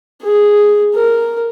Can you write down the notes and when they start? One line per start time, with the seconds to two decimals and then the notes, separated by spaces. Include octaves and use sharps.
0.22 G#4
0.95 A#4